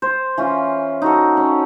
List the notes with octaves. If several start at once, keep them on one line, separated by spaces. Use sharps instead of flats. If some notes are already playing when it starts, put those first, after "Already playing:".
C5
E3 C#4 F4
D#4 F#4 A4
C#4